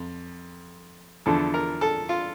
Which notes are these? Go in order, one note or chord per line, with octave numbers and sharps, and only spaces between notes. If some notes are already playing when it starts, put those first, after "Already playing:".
Already playing: F2
E2 D3 F3 A4
A#4
A4
F4